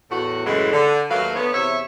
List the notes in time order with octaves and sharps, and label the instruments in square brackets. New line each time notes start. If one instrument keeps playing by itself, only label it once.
[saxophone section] E2 A2 F#4
F#2 A2 C#3 E3 G#3
D3
D#2 F#3 A3 A#3 B4 F5
D3 B3 C#5
E2 C3 C#5 E5